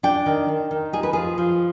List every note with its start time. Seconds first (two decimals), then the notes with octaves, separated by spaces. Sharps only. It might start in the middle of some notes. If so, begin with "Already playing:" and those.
0.03 D4 G5
0.26 D#3
0.48 D#3
0.71 D#3
0.93 D#4 G#4
1.03 B4
1.13 F3 G#4
1.38 F3